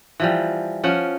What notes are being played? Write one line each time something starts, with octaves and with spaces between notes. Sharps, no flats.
E3 F3 G3
F3 C#4 F#5